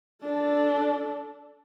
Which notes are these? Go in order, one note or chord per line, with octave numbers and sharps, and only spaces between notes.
D4 A4